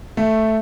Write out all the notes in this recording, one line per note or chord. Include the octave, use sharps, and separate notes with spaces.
A3